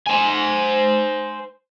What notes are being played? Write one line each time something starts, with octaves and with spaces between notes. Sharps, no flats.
C5 G#5